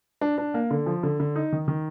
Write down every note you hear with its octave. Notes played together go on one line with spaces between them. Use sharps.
D4
D4
A#3
D3
F3
D3
D3
D#4
D#3
D#3